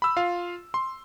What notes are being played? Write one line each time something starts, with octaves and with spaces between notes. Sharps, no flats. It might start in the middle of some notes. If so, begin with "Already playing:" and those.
B5 E6
F4 F5
C6